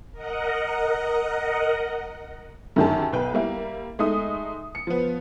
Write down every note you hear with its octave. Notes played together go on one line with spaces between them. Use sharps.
A#4 D#5 F#5
F#2 D3 D#3 G4 G#4 A5
B1 B4 G5
G3 A#3 E4
G#3 A3 D#4 D#6
C#7
F3 B3